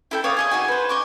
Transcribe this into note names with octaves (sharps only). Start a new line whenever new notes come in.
E4 A4 G5
C#5 D5 F5 D#6
G#4 D#5 G#5
D#4 F#4 G#5
B4 C5
D#5 C#6 D6